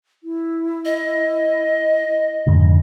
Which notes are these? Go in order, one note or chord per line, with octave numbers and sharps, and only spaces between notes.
E4
D#5
F2 G#2 D3